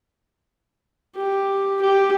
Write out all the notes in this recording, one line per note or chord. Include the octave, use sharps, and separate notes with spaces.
G4
G4